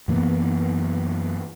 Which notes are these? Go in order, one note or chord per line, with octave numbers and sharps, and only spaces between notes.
F#2 E3 A#3 B3